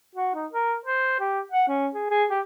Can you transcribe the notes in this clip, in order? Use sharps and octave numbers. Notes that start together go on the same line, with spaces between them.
F#4
D#4
A#4
C5
G4
F#5
C#4
G#4
G#4
G4